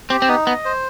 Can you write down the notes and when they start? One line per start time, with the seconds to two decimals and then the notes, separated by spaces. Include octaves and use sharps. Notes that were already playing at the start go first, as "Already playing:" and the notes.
0.10 C4 G4
0.22 C4
0.28 B3 D#4
0.46 B3 D#5
0.65 C5